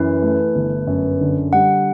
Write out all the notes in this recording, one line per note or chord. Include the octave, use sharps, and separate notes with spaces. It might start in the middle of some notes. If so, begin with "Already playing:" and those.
Already playing: F#2 E3 B4
A3
G1
F#2
D3
G3 F#5